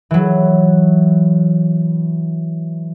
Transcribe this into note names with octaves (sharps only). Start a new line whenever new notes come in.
E3 F#3